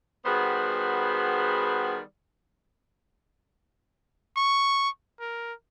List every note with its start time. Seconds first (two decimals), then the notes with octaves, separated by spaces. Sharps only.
0.26 D#3 G3 B3 F#4 G#4 C5
4.36 C#6
5.20 A#4